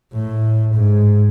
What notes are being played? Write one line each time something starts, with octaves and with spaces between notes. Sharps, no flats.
A2
G#2